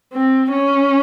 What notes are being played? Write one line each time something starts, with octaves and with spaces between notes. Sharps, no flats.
C4
C#4